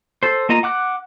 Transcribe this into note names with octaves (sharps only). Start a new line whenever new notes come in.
A4 C5
A#3 F4 D#5 A#5
F#5 D6 F#6